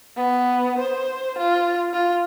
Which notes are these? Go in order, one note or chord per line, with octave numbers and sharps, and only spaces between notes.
B3
C5
F4
F4